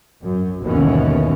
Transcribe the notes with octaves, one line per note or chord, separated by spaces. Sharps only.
F#2
G1 D#2 B2 E3 C#4